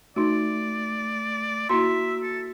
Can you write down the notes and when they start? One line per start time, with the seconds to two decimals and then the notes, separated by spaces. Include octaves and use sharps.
0.16 A3 D#4 F#4 D5
1.69 A#3 E4 F#4 E5 C6
2.23 A4